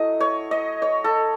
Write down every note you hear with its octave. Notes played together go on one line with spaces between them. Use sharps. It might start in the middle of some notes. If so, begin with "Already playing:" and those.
Already playing: F#3 A3 E4 D#5
C#5
D#5
C#5
A4